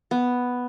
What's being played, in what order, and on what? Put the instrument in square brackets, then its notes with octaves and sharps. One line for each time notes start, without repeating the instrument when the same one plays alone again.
[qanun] B3